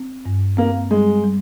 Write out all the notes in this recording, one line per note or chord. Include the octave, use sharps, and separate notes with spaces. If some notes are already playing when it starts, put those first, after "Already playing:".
Already playing: C4
G2
A#3 C4
G3 G#3
G3